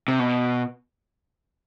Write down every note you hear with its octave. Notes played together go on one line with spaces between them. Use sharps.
C3
B2